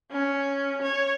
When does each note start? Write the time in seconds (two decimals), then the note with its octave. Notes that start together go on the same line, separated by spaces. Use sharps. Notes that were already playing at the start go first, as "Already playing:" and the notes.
0.11 C#4
0.82 C#5